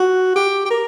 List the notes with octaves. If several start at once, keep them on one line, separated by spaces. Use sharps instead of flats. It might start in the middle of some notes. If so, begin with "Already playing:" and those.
Already playing: F#4
G4
G4
A#4